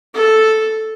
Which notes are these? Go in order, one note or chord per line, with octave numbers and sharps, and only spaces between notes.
A4